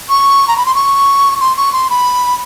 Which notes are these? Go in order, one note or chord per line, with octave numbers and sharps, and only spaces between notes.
C#6
A#5
B5
C6
C#6
C6
C#6
C6
B5